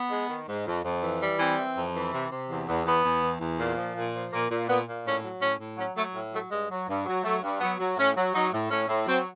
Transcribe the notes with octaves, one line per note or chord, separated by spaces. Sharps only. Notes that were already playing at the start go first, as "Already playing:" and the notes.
Already playing: B3
G#3
D#3
G#2
F2
F2
E3
G3
E3 C4
E3
F2
E3
C3
C3
E2
E2
E2 B3
E2
E3
E2
A#2
F3
A#2
F3
A#2 A#3
A#2
A#2 B3
A#2
A2 C#4
F#3
A2 C#4
A2
F#3 C#4
F#3 A3
A2
F#3 A3
G2 G#3
F#3
G2
F#3
F#3 A3
G2
F#3 B3
F#3
A2 C#4
F#3
F#3 D#4
A2
A2 C#4
A2
F#3 C4